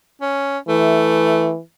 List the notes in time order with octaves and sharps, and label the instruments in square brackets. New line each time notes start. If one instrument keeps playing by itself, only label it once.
[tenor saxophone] C#4
[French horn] E3 [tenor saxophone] A3